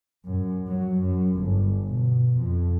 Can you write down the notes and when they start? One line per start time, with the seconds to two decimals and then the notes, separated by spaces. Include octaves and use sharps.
0.25 F#2
0.68 F#3
0.99 F#2
1.35 G1
1.86 B2
2.38 F2